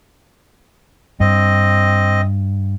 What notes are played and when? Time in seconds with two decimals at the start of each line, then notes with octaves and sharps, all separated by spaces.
1.20 G2 C4 D#5